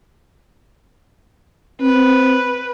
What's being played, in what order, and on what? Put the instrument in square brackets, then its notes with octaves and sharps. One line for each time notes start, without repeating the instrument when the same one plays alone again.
[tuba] C4 [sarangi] B4